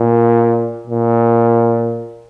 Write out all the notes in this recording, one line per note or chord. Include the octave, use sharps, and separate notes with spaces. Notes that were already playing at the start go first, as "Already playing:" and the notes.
Already playing: A#2
A#2